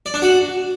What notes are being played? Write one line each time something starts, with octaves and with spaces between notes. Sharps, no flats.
D5
D4
F#4